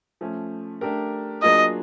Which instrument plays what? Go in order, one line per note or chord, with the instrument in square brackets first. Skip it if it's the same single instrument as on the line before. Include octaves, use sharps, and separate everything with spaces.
[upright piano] F3 A3 C#4
A3 D4 G4 A#4
[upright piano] F#3 A#3 D4 F4 G#4 [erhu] D#5